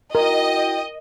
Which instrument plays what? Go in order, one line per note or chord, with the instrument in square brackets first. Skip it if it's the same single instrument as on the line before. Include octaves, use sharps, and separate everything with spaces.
[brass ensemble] E4 F#4 G5 [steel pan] A#4 [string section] D#5